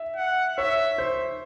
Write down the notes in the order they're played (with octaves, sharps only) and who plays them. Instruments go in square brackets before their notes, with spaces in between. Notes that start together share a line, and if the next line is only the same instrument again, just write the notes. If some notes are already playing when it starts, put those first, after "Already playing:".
Already playing: [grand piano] E5
[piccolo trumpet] F#5
[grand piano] C#5 [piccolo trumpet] E5
[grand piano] C5